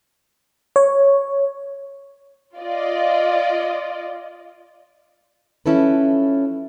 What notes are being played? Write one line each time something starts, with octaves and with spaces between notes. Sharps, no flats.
C#5
F4 D5 D#5
F3 C#4 E4 A4 B4